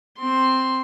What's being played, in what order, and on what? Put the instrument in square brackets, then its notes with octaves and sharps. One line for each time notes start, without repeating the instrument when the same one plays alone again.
[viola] C4 C6